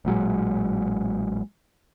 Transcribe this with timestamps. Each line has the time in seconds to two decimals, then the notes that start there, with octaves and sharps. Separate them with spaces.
0.05 A1 A#2 F#3 G#3